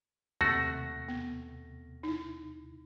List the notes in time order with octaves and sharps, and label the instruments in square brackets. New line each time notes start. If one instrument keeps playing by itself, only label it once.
[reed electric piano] D#2 C3 [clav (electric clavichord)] A3 F#4 [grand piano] A#6
[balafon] B3
D#4 E4